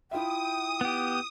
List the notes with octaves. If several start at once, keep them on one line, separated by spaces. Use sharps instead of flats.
E4 F4 E5 G5 D#6
B3 G4